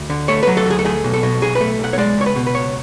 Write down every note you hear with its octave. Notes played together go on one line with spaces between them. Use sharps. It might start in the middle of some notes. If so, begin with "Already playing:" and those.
Already playing: D2
D3
A3 C#5
F#3 B4
A4
D2 G#4
A4
A3 G#4
B1
A4
B2
B1 G#4
B4
A3
B1 F#5
C#5
G#3 D5
C#2 C#5
B4
B2
B4
C#2 C#5